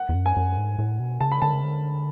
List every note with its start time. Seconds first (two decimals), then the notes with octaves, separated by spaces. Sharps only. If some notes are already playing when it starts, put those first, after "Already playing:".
Already playing: F#5
0.09 E2
0.15 F#2
0.26 G#5
0.37 F#2
0.57 G#2
0.79 A2
0.99 B2
1.21 C#3 A5
1.32 B5
1.42 D3 A5
1.53 C#3
1.63 D3